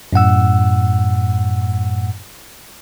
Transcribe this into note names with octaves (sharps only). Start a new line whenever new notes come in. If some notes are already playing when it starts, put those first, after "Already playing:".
F#2 A2 F#5 E6